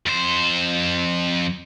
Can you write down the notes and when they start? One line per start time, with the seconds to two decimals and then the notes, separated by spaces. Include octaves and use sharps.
0.06 F2 C5